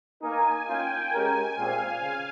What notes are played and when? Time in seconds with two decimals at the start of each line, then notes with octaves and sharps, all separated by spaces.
0.22 A#3 D#4 A#4 G#5
0.67 A#3 C#4 F4 G5
1.12 G#3 C#4 G4 A#4 G#5
1.56 A#2 G#3 C4 F5
2.01 C#3